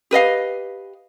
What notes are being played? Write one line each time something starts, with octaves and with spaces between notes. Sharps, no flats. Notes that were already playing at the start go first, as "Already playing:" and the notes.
G4 B4 D#5 F5